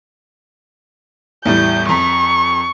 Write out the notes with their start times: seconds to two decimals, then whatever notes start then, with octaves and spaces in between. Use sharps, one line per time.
1.45 E2 A2 G3 G6
1.89 F2 A#5 C#6 B6